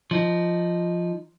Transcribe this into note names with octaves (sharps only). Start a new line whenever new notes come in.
F3 D#4